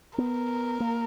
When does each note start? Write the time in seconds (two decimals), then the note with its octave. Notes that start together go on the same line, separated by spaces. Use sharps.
0.18 B3 A#4
0.80 A#3